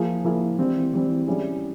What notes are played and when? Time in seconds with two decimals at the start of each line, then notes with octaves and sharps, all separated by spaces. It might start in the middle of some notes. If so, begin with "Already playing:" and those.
Already playing: F3 A#3 E4 G#4
0.24 F3 A#3 E4 G#4
0.58 E3 G3 C4
0.93 E3 G3 C4
1.27 G3 C#4 E4 G#4